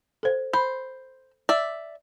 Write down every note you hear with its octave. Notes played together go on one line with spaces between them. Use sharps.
A4 C5
C5 B5
D5 E5